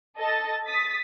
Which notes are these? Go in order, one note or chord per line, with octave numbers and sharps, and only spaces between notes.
A4 D#5 A6
D#6 A6 B6